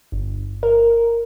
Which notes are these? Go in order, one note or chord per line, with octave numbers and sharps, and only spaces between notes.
G1
A#4